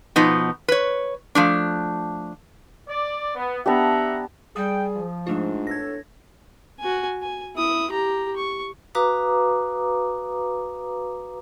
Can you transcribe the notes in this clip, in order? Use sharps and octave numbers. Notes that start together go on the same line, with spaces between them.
B2 F3 B3 D#4
B4 C#5
F3 A3 D4
D5
B3
B3 D4 G4 E5 F#5 A#5
G3 G#4 G5 D#6
F3
G#2 G#3 A3 D4 F4
E2 A4 C#5 G#6 A#6
F#4 G#5
G#5
E4 D#6
G4 A#5
C#6
F#4 B4 F5 A#5 D6 D#6